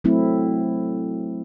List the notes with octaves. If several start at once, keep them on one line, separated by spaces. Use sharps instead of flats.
F#3 A3 C4 E4